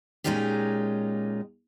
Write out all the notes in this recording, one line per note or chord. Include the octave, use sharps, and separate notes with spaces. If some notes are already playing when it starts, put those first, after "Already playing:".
A#2 G#3 C#4 D#4 F4 G4